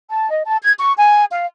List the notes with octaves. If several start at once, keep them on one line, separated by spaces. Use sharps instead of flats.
A5
D#5
A5
G#6
C#6
G#5
F5